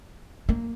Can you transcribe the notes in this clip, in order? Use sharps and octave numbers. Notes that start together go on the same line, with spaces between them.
A#3